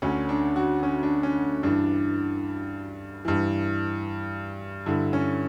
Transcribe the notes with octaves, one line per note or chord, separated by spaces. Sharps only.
D2 D3 C#4
D4
F#4
C#4
D4
C#4
G2 E3 D4
G2 E3
G2 D3 E4
C#4